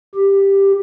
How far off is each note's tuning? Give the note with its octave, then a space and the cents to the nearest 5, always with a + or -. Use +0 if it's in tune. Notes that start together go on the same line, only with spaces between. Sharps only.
G4 +5